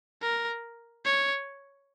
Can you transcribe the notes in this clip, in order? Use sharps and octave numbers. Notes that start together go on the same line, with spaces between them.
A#4
C#5